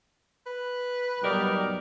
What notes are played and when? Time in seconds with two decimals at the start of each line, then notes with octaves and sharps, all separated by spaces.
0.46 B4
1.23 F#3 G3 B3 D#4 G4 A#4 D5